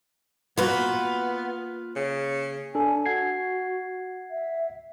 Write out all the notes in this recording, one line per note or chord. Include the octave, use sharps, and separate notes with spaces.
A#3 B3 F4 F#4 B4
C#3
D4 A4 G#5
F#4 F#5 G#6 C7
E5